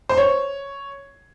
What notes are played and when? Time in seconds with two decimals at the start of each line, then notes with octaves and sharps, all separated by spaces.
0.09 C5
0.18 C#5